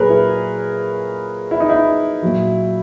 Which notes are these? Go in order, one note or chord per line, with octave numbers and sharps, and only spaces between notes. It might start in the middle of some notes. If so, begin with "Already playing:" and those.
Already playing: A#2 F#3 G#4 A#4 B4 C#5
E4
E4
D#4
E4
A#2 F#3